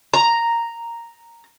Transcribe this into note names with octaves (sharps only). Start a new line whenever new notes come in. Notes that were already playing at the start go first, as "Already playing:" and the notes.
A#5